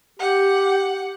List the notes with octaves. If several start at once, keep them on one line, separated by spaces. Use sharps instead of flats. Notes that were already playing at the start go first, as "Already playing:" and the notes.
G4 F#5